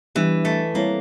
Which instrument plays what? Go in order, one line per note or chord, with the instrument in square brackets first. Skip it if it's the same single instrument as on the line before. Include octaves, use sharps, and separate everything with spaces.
[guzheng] E3 [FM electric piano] G3 B3 D4 G4
[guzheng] A3
[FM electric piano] G3 C4 E4 A4 C#5 [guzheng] A#3